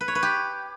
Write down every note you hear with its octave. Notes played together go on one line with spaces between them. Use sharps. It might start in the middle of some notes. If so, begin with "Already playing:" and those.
B4
C#5
B4
G4